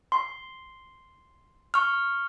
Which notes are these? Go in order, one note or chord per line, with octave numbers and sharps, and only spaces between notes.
C6
C#6 F6